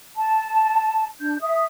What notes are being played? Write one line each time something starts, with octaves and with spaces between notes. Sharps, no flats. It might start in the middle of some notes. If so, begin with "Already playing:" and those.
A5
D4 G6
E5 D#6